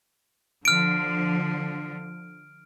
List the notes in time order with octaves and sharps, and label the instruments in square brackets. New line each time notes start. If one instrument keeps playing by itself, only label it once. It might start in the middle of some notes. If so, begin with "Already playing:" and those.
[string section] D3 F3 [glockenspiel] F6 D7